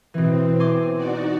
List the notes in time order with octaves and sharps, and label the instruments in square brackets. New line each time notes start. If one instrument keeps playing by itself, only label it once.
[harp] B2 E3 [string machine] C4
[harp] G#5 C6 D6
[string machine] D#4 F#4 D5